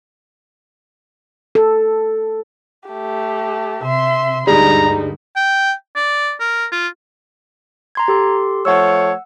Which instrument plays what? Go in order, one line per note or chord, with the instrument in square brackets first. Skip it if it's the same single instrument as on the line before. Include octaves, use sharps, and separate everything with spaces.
[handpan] A4
[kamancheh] A3 G4
[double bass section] C3 [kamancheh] E5 C6
[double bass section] D2 G2 D3 [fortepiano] G3 G#3 [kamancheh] D#4 [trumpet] A#5
[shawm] G5
D5
A#4
F4
[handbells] A#5 C6 G#6
G4 A4 C6
[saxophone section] F3 A3 C#5 [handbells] F#5 E6